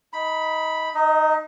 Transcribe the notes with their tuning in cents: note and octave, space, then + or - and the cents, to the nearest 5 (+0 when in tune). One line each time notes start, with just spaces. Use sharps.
D#4 +20 B5 +0
D#4 -15 D#5 +25